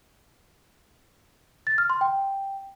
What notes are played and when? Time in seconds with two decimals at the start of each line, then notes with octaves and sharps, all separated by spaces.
1.67 A6
1.78 F6
1.90 C6
2.01 G5